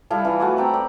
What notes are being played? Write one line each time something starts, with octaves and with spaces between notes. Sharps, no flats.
G3 E4 A4 F5
E3 F4
A3 F#4 D6
C4 G5 A#5 B5
D5